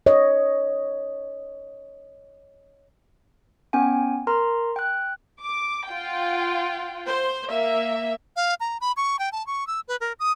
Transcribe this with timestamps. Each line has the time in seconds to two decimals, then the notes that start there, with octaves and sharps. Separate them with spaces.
0.06 C#5 D#5
3.73 B3 C#4 G5 G#5
4.27 A#4 A#5 C6
4.76 G5 F#6
5.42 D6
5.90 F4 F#5 G5
7.07 C5
7.51 A#3 E5
8.36 F5
8.60 A#5
8.81 B5
8.97 C#6
9.19 G5
9.32 A5
9.47 C#6
9.67 E6
9.88 B4
10.00 A#4
10.19 D#6